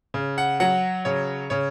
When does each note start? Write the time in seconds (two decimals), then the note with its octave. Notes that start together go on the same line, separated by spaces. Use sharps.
0.14 C#3
0.38 F#5
0.60 F#3 F#5
1.05 C#3 C#5
1.50 C#3 C#5